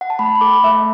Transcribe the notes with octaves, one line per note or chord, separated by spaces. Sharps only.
F#5
A5
A3 B5
B5
A4 D6
A3 E5